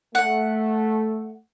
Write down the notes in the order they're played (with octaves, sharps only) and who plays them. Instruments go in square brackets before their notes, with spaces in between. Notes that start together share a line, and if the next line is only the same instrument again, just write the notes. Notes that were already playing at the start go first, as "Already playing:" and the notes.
[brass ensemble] A3 [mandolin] F#5